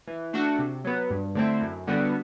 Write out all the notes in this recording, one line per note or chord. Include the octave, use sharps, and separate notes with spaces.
E3
A3 D4 F#4 A4
C3
F#3 B3
G2
D3 A3 C4 E4
F#2
D3 G3 B3 F#4